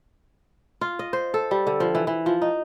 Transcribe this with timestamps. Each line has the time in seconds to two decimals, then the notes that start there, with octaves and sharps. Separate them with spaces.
0.81 F4
0.99 D#5
1.13 C5
1.34 A4
1.51 G3
1.67 D3
1.80 F3
1.95 E3
2.07 E3
2.26 F3
2.41 D#4